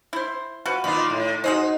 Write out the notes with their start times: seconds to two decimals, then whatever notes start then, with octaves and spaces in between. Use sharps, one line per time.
0.13 E4 C5
0.65 F3 F#4 B4
0.84 A#2 D#3 F4 B5
1.10 A2
1.44 D#4 F#4 G#4 C5